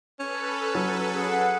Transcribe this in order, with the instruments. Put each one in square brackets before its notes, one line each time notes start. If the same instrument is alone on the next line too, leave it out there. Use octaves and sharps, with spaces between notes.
[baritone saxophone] C#4 [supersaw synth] A4 B4
[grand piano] F#3
[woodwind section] G#4 F#5